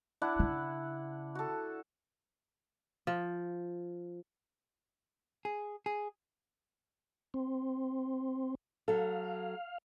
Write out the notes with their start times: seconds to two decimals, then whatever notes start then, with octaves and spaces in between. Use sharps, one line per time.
0.22 D4 E4 F#5
0.39 C#3
1.35 F#4 A4
3.07 F3
5.45 G#4
5.86 G#4
7.34 C4
8.88 F#3 A4 F5